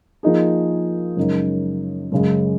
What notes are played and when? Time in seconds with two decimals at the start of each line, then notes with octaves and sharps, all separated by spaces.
0.23 F3 A#3 D#4 G#4
1.17 F#2 C#3 G#3 D#4 A#4
2.12 F#2 C#3 G#3